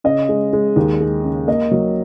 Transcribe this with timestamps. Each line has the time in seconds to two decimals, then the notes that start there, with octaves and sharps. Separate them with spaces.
0.04 C#3 D#5
0.29 G#3
0.53 G#3
0.76 D#2
1.00 G#3
1.24 C#3
1.48 A#3 D#5
1.71 F#3